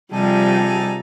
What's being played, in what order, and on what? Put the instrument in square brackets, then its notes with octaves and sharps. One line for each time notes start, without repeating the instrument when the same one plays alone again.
[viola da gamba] C3 F3 [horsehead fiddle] G3 [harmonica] D#4 G#4 A4